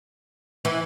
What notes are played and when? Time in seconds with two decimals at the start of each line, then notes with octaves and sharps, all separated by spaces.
0.65 E3